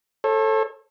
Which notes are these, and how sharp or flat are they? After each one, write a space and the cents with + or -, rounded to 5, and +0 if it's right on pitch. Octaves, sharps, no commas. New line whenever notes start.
A4 +0 C#5 -40